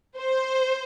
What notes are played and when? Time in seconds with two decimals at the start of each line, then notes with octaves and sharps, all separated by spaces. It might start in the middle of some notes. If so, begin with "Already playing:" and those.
0.16 C5